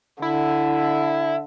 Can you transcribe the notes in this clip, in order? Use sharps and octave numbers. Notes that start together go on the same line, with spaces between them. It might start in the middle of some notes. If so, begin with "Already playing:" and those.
D3 E4